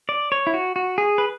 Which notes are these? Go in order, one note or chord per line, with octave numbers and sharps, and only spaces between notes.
D5
C#5
E4
F#4
F#4
G#4
B4